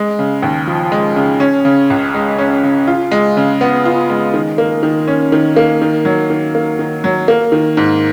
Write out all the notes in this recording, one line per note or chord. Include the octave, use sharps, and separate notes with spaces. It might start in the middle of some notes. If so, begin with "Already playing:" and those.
Already playing: G#3
C#3
D#2
F3
G#3
C#3
C#4
C#3
C#2
G#3
C#4
C#3
F4
G#3
C#3
B3
F4
G#3
D#3
A#3
D#3
C#4
D#3
A#3
D#3
F#3
D#3
A#3
D#3
F#3
A#3
D#3
G#2